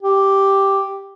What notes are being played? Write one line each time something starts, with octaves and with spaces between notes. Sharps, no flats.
G4